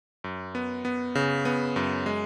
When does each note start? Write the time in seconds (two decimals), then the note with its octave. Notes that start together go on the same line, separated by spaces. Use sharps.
0.24 F#2
0.55 B3
0.85 B3
1.15 C#3
1.45 B3
1.76 F#2
2.06 G#3